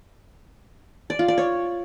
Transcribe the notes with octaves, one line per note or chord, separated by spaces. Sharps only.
D5
F4
D5
C#5